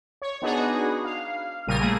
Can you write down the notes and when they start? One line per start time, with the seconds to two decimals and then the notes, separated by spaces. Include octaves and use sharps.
0.22 C#5
0.42 B3 D4 D#4 F#4 G#4
1.05 F5
1.67 A#1 A#2 C#3 G3 A#4 D#7
1.80 A3 A#3 G#4